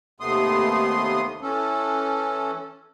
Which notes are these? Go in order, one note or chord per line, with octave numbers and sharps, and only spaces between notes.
D#2 C3 A3 B3 C6 D#6
E3 C#4 A4